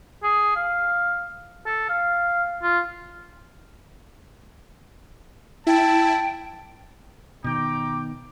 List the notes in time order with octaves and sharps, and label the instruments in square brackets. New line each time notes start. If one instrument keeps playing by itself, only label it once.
[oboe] G#4
F5
A4
F5
F4
[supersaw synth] E4 [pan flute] G5 [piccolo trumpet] A5
[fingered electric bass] B2 D#3 [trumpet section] G5 A#5 D6